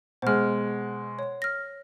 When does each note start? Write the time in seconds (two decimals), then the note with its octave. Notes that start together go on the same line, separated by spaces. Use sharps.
0.22 B2 G#3 C5 F6
1.19 C#5
1.42 F6 A#6